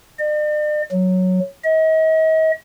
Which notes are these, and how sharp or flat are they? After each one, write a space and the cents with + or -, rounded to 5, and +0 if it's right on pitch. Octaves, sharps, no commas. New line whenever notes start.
D5 +45
F#3 -5
D#5 +40